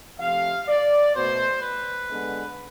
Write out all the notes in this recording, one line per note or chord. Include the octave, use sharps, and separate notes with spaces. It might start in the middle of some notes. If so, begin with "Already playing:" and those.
C3 F3 A3 F5
D5
B2 A3 C5
B4
D3 G#3 B3